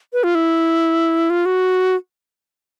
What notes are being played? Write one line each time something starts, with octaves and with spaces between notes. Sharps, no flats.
B4
F4
E4
F4
F#4